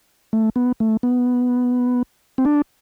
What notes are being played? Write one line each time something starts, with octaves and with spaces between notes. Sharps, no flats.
A3
B3
A3
B3
C4
D4